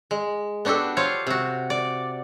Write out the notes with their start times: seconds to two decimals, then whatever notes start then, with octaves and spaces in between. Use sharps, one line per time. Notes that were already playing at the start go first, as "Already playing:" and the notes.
0.11 G#3
0.65 B3 D4 F#4 G4 A4
0.97 F4 C5 C#5 F5
1.27 C3 F#4
1.70 D5